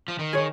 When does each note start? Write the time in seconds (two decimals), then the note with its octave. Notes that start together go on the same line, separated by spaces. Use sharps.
0.08 F3
0.19 D#3
0.33 D#3 G#4 C#5